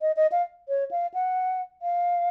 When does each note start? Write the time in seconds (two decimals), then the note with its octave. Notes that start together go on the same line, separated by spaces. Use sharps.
0.01 D#5
0.16 D#5
0.32 F5
0.69 C#5
0.91 F5
1.14 F#5
1.82 F5